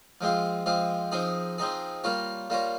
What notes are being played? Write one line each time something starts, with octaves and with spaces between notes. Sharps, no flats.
F3 G#3 C4 F4
F3 G#3 C4 F4
F3 C4 D#4 G#4
F3 C4 D#4 G#4
G3 A#3 F4 A#4 C#5
G3 A#3 F4 A#4 C#5